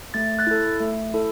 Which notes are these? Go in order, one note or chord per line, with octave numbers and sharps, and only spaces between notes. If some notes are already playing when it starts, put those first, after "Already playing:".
A3 A6
F#6 A6
E4 A4
A3
E4 A4